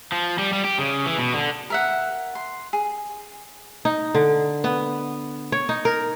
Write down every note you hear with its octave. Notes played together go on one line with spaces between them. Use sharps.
F3
G3
G3
G4
C#3
E3
B2
D3
A#4 E5 F#5
C6
G#4
D#4
D3
B3
C#5
D#4
A#4